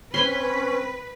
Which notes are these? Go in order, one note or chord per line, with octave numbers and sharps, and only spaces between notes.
C4 C#4 B4 G#5 B5 C6